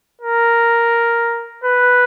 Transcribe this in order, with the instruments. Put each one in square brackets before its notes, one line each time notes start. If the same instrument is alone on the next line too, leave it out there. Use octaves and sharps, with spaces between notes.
[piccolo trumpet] A#4
B4